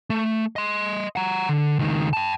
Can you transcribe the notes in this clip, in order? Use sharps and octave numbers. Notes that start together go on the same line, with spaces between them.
A3
D#5 C6
F#5 A#5
D3
C#2 D#3
G5 A5